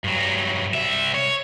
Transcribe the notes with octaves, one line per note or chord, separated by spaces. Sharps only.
G2 F#3
C2 E5
C#5